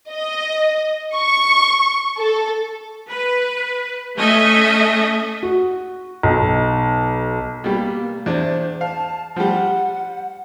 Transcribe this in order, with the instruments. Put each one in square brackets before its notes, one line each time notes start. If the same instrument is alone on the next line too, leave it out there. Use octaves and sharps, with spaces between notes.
[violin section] D#5
C#6
A4
[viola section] B4
A3 C#4 A4 D#5 E5
[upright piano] F#4
B1
[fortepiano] B2 G3 [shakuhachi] A#3
[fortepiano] E2 D4 [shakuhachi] C5
[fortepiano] F5 [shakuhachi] A5
[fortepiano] F3 G3 [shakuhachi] F#5